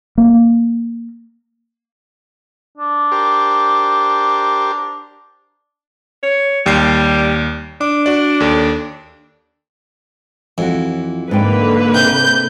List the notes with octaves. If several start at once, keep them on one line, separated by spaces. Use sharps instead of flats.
A#3
D4
G4 A#4 C5
C#5
D#2 G3 C7
D4 D6
F#4 D5
D#2 A4
F2 E3 F4 F#4
G#2 D3 A#3 B4 G5
C3 G6